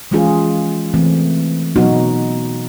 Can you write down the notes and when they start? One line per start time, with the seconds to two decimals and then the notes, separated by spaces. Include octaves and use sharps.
0.11 E3 G#3 C#4 F4 G#4
0.94 E3 A3 C4
1.76 B2 F#3 B3 D#4 F#4